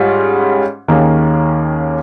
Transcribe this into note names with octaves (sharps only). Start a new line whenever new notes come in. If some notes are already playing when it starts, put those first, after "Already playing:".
Already playing: G#2 G3 C#4 F4 G#4
D#2 D#3 A#3 C#4 G#4